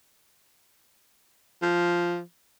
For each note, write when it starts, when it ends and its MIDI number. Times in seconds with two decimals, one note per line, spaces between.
1.62 2.21 53